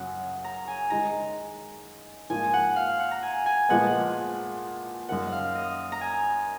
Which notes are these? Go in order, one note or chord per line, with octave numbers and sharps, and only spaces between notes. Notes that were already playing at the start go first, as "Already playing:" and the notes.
Already playing: F#2 C#3 F#3 C#4 F#5
A#5
G#5
D#3 G#3 D#4 A#5
G#2 F3 A#3 G#5
F#5
F5
F#5
A#5
G#5
G#5
A#2 F3 G#3 B3 F#5
F#2 D#3 A#3 F#5
F5
D#5
A#5
G#5